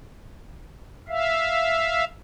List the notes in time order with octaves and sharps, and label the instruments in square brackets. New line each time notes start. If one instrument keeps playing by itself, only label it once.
[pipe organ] E5 F5